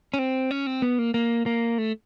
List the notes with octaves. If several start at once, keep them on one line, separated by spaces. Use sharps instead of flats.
C#4
C4
C#4
C4
B3
A#3
A#3
A#3
A3